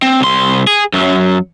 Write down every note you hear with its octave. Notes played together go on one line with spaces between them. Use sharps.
C4
C2 C6
G#4
F#2 F#3